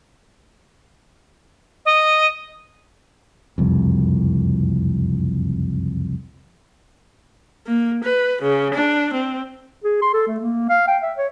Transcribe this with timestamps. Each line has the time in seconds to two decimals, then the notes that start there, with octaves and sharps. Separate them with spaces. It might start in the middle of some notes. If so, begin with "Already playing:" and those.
1.85 D#5
3.58 F#1 C2 F2
7.66 A#3
8.03 B4
8.41 C#3
8.73 D4
9.13 C4
9.84 G#4
10.02 C6
10.14 A4
10.27 A3
10.40 A#3
10.69 F5
10.88 G5
11.02 E5
11.18 C#5